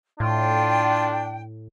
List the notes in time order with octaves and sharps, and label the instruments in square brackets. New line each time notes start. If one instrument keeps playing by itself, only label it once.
[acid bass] A2 [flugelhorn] D4 [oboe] F4 [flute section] G5